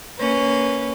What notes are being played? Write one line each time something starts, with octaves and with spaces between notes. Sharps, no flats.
A#3 C#4 B4